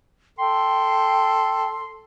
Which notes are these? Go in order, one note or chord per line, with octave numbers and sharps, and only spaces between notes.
A4 G5 C6